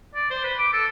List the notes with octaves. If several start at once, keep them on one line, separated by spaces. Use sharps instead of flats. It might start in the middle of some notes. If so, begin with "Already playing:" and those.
D5
C5
B4
D6
A4